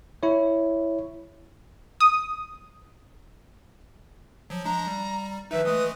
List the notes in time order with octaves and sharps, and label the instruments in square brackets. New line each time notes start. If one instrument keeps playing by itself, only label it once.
[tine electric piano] E4 C#5
[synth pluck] D#6
[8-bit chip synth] F3 F#3
[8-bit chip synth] F3 G#3 D4 [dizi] A#5
[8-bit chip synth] G3
[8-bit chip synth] D#3 F3 D#4 [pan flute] B4 [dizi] E5
[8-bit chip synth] E3 G#3 A3 [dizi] D#6